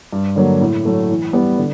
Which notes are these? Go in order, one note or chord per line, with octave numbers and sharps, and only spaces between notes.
G2
D3 F#3 A#3
A2
F#3 A3
E3
G3 B3
D3